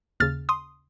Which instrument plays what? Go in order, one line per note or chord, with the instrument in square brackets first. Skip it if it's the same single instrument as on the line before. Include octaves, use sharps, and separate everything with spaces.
[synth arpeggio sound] D#2 C#3 F6 A6
C6 D#6